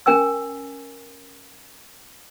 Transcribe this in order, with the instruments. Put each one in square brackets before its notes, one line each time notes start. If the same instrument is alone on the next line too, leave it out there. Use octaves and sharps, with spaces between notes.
[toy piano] C#4 A#4 G5 G#5 E6